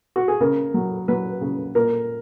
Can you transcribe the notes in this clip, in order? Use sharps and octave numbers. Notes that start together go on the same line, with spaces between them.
F#4
G#4
C#3 A#4
F#3
F#3 B4
C#3
A#2 A#4